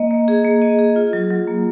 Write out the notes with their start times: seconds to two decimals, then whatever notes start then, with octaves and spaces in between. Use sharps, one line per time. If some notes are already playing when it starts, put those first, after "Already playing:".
Already playing: A#3 D#5
0.11 A#3
0.28 G#4
0.45 A#3
0.62 D#5
0.79 G#4
0.96 F4
1.13 F#3
1.30 F#3
1.47 A#3